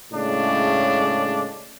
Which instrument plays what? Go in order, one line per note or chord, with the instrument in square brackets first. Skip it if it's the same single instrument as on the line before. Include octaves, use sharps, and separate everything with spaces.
[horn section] A2 C#3 G#3 D4